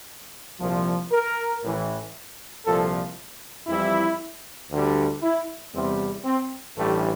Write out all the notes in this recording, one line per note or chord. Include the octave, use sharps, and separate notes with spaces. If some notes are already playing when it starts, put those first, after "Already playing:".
C2 A#2 F3
A#4
A1 A2 E3
C2 A#2 F3 A4
F2 E3 G3 E4
D2 D3 G3
E4
E2 C3 G3 C4
C4
A1 G2 E3 G3 A3